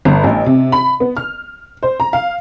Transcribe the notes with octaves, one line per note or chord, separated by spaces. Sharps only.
G1
A1
C3
B5
B3
F6
C5
A#5
F5